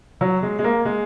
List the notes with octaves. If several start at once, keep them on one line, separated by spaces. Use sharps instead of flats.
F#3
G#3
G#3
A#3
G#3